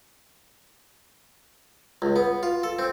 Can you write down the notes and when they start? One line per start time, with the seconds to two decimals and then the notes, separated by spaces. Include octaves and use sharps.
2.02 C#2
2.16 B3
2.43 F4
2.63 A4
2.79 C4